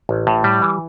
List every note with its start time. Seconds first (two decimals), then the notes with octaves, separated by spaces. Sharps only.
0.09 A1
0.27 A2
0.44 G3
0.62 E3